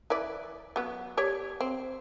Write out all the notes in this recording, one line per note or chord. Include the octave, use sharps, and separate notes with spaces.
E3 B4 D5
F#3 B3
G4 C#5 D5
C4